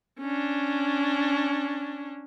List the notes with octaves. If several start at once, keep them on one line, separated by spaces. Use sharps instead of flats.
C#4 D4